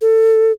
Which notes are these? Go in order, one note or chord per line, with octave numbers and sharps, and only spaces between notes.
A4